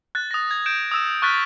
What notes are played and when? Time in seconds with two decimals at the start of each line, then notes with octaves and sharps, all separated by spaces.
0.15 F#6 A6
0.31 D#6 A#6
0.51 G#6
0.66 G6 D7 E7
0.91 D#6 E6 E7
1.22 C#6 F6 F#6 A6 B6